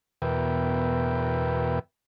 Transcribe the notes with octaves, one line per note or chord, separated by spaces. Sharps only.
E2 B2 A#4 B4 E5 G5